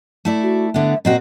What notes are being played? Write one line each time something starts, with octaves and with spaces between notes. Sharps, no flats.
A3 E4 D5
F#4
D3 B3 E5
A#2 C4 F#4 D#5